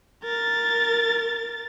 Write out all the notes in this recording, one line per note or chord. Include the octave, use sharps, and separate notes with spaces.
A#4 A6